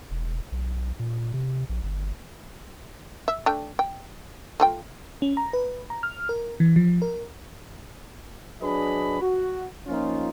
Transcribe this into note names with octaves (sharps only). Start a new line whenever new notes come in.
E1
B1
A#2
C3
A#1
G1
E5
A3 D4 G5
G5
A3 F4 G5
C#4
A#5
B4
A#5
F6
A#4
E3
F3
A#4
F#3 D4 G#4 B4 D#5 B5
F#4
F3 A#3 C#4 D#4 F4